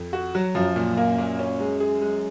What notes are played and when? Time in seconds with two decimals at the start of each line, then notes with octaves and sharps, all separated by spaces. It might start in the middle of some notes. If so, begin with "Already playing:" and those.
Already playing: F2
0.13 F#4
0.35 F#3
0.55 F#2 F3
0.76 A#2
0.97 A#3
1.18 A#2
1.39 C#4
1.60 G#3
1.80 G#4
2.01 G#3